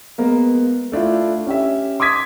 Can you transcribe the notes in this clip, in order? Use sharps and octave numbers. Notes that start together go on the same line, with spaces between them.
G#3 A#3 B3
A3 D4 E4 F4
C#4 G4 E5
C6 D6 D#6 G#6 B6